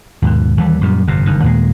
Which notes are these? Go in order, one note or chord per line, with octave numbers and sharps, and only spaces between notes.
D#2 G#2 B2
D#2 E3 G3
F#2 A#2 G3
G1 F2 C3
F#1 G2 D#3
D#2 A#2 G3 G#3